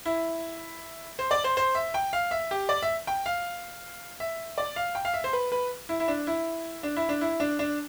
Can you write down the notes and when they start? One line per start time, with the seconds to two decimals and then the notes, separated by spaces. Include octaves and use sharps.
0.06 E4
1.19 C5
1.31 D5
1.44 C5
1.57 C5
1.75 E5
1.94 G5
2.13 F5
2.31 E5
2.51 G4
2.69 D5
2.82 E5
3.07 G5
3.26 F5
4.20 E5
4.58 D5
4.76 F5
4.95 G5
5.05 F5
5.14 E5
5.24 C5
5.33 B4
5.52 B4
5.89 E4
6.00 E4
6.08 D4
6.27 E4
6.83 D4
6.96 E4
7.09 D4
7.21 E4
7.40 D4
7.59 D4